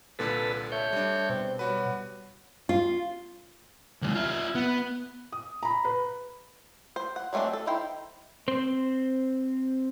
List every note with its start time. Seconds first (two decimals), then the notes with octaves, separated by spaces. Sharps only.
0.19 C2 A#2 D3 A4 B4
0.72 A3 C#5 G6
0.92 G3 D4
1.29 B2 C4
1.59 F#3 G3 F#4 B4
2.69 F4
4.02 D#2 G#3
4.15 F4 E5
4.55 B3
5.32 D#6
5.63 A#5 B5
5.85 B4
6.96 C5
7.16 F#5
7.33 F#3 G#3 A3 C4 D4
7.53 A4
7.67 D#4 E4 C5 G5
8.48 C4 C5